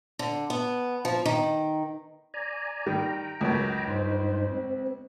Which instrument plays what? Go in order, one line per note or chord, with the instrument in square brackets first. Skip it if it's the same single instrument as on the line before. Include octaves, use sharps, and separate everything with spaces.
[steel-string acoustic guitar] D3
B3
F3
D#3
[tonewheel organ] D5 G#5 A#5
[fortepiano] D#3 G3 [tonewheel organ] G5 A#5
[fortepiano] C#2 F#2
[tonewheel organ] G2 D#4 C5
C4